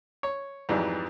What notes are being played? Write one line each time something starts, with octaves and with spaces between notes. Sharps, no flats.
C#5
F2 G#2 E3 F#3 G3